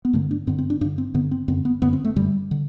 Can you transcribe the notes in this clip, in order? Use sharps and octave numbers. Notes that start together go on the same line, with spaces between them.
B3
G2 D3 A3
D4
G2 D3 C4
C4
D4
G2 D3 D4
C4
G2 D3 B3
C4
F#2 D3 C4
B3
F#2 D3 B3
C4
A3
F#2 D3 G3
D3